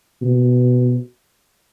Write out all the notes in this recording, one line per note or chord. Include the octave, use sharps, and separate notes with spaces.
B2